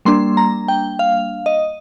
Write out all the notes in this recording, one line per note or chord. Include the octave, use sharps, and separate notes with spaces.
G3 A#3 D4 C6
A#5
G5
F5
D#5